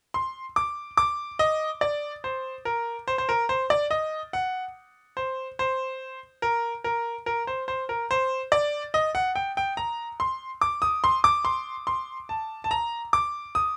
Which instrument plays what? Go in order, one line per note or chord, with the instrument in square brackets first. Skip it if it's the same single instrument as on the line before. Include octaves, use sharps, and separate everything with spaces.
[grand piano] C6
D6
D6
D#5
D5
C5
A#4
C5
C5
A#4
C5
D5
D#5
F#5
C5
C5
A#4
A#4
A#4
C5
C5
A#4
C5
D5
D#5
F#5
G5
G5
A#5
C6
D6
D#6
C6
D6
C6
C6
A5
A5
A#5
D6
D#6